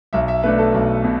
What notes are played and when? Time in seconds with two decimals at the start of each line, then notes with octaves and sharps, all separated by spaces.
0.13 B1 E5
0.28 E5
0.43 B2 A3 D4 B4
0.59 A4
0.74 B1
1.04 B2